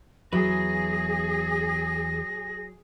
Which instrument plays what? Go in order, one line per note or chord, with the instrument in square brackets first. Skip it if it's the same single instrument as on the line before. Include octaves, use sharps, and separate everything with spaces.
[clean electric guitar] E2 E4 B4 [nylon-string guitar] F#3 [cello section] G#4 [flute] A#6